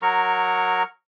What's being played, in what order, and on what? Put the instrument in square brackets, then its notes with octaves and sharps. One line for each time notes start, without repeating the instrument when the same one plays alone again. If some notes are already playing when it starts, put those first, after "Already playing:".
[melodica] F#3 A#4 A#5 C#6